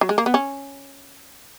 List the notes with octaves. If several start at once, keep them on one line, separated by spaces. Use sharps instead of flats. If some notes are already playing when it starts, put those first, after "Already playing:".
F#3
G#3
A#3
B3
C#4